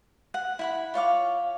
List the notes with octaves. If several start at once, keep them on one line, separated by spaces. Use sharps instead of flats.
F#5
E4 F#5 B5
F4 C#5 F5 D6